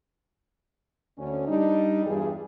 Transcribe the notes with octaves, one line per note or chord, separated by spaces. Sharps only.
D2 C#4
G3 D4 D#4
E2 G2 G3 F4 G#4